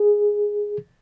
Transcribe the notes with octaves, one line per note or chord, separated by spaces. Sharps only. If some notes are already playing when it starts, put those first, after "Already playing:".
Already playing: G#4